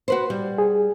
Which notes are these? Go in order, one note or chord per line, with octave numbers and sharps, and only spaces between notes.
F#4 B4 C5
G3
G#4